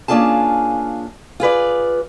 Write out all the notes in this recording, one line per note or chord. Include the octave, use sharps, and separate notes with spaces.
A#3 C#4 D4 F4 G#4 A5
F4 G#4 B4 D5